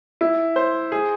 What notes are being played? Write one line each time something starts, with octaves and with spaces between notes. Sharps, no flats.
E4
C5
G#4